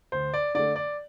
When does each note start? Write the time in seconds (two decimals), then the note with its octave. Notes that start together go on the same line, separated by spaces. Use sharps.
0.12 D2 C5
0.34 D5
0.55 D3 A3 D5
0.76 D5